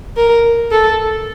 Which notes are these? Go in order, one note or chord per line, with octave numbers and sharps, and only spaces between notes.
A#4
A4